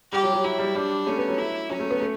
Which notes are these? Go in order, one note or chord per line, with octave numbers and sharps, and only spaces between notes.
G3 G4
F#3
F#3
F#3 E4
G3
G3 D4
A3 C#4
B3
F#3
E4
F#3 C#4
A3
B3
A3